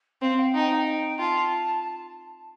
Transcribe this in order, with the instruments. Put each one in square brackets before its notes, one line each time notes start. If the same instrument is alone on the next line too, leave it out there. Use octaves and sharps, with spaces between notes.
[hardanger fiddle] C4 [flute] F5
[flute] G5
[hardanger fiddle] D#4 [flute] A5
[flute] G5
F5
G5
[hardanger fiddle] F4 [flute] A5